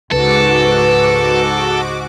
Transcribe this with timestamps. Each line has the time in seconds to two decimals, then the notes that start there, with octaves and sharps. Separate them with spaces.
0.11 C#2 G#2 F#4 A4 B4 D6